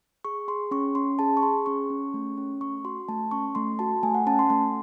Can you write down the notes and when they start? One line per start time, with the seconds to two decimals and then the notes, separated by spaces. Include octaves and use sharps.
0.25 G#4 C#6
0.48 G#4 C6
0.71 C#4 C#6
0.95 C#4 C6
1.19 G#4 A5
1.37 C#6
1.42 G#4 C6
1.66 C#4 C#6
1.90 C#4
2.14 A3
2.38 C#4
2.61 A3 C#6
2.85 F#4 C6
3.08 A3 A5
3.31 C#4 C#6
3.55 A3 C6
3.79 F#4 A5
4.03 A3 G#5
4.15 F#5
4.27 C#4 A5
4.39 C6
4.50 A3 C6